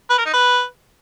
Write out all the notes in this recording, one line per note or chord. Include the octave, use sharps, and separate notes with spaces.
B4
A#4
D#4
B4